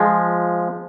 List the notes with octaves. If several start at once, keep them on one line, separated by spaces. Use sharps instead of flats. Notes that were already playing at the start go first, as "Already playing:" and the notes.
Already playing: F3 G#3